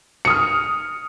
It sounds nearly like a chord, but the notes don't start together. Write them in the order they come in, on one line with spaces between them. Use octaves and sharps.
C#7 D#6 F6